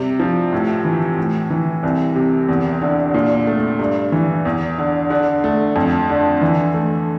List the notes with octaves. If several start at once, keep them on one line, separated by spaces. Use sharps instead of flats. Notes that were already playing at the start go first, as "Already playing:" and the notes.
Already playing: C3 G3
F3
A2
E3
A2
E3
C2
C3
E2
D3
A#2
A3
G2
E3
E2
D3
D3
A3
F2
D3
E3
A3